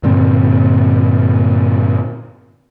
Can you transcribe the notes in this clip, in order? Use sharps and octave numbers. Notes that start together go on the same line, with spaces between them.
G2 A#2 D3 C4